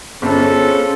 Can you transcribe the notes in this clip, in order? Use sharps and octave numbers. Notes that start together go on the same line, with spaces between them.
G1 C4 C#4 F4 G#4 A4 C5